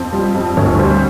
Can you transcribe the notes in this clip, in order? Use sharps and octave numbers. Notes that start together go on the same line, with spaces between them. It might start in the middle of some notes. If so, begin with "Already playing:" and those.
Already playing: F2 C5
G3
F2
D2 C#5
G3 C5